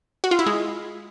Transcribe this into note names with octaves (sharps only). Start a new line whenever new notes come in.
F#4
F4
E4
G#3